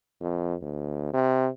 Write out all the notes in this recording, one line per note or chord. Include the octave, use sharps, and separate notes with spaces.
F2
D2
C3